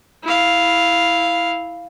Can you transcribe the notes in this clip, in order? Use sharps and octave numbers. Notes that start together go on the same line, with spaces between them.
E4 F5